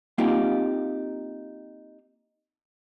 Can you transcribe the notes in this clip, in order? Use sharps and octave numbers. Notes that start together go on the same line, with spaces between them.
A#3 C4 D#4 F4 G4